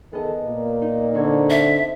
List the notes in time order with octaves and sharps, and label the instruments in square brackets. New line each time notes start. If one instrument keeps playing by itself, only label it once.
[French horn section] D#3 G#4 A4 [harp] B3 D#5
[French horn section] A#2 A#3
[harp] D#4
[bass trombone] D3 [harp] C4 C#6 G#6
[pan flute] E5